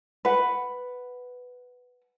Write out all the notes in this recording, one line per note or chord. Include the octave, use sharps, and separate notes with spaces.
B4 F#5